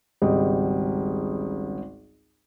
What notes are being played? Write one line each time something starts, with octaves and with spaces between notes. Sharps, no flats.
G#1 C#2 G3 D#5